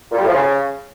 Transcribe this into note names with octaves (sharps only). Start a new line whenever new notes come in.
A#2
G3
A2
F3
C#3